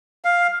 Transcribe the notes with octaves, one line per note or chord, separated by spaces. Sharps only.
F5